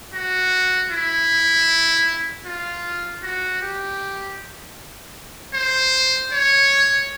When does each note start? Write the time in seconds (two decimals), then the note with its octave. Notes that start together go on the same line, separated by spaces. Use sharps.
0.13 F#4
0.91 E4
2.45 F4
3.23 F#4
3.61 G4
5.54 C5
6.32 C#5